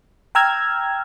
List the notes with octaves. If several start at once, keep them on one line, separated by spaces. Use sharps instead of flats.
G5 A#5 E6 F6 G#6